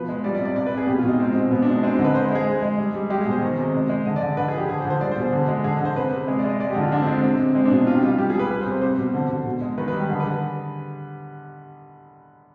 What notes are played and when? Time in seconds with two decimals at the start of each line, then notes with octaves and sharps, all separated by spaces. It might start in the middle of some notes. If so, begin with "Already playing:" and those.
Already playing: B2 F3 B4
0.09 G#3
0.24 G3 D5
0.35 D5
0.40 C3
0.45 D5
0.56 C3 D5
0.66 B4
0.72 C3
0.77 G#4
0.87 B2 G4
0.98 F4
1.04 B2 D#4
1.20 G#3 C4
1.30 C4
1.35 B2
1.51 B2 B3
1.62 D4
1.67 G#3 D#4
1.83 G#3 C4
1.94 D#4
1.99 D3
2.04 B4
2.15 G#3 C5
2.25 C5
2.31 G#3 G#4
2.47 G#3
2.62 G#3
2.78 G3
2.94 G3
3.10 G#3 G4
3.21 G#4
3.26 B2 C5
3.42 D#3
3.58 C3
3.74 G#3
3.89 G#3
4.05 D3 D#5
4.16 D5
4.21 D3
4.37 D3 B4
4.48 G#4
4.54 F3 G4
4.69 D3 G#4
4.80 C5
4.85 D3
4.90 C5
5.01 G3 D5
5.12 C5
5.16 B2
5.22 G#4
5.33 D3
5.48 G#3
5.64 D3 G#4
5.80 D3
5.85 C5
5.96 C3 B4
6.12 C3
6.28 G#3 G#4
6.39 D5
6.44 G#3
6.49 D#5
6.60 G#3 D5
6.70 G4
6.75 D3
6.81 F4
6.92 D3 D4
7.02 C4
7.07 G#3
7.23 C3 C4
7.39 C3
7.55 G#3 C4
7.65 D4
7.71 B2
7.76 D#4
7.87 C3 F4
7.95 G4
8.03 G3 F4
8.18 G3 G4
8.30 G#4
8.35 G3 B4
8.50 G3 B4
8.61 C5
8.66 C3
8.72 C5
8.82 G3 C5
8.98 B2
9.14 D3
9.30 D3
9.46 B2
9.62 G#3
9.78 D#3 B4
9.88 B4
9.93 G3
9.98 G4
10.09 D3 G#4
10.20 B4
10.25 D3